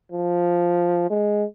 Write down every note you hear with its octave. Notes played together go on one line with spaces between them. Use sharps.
F3
G#3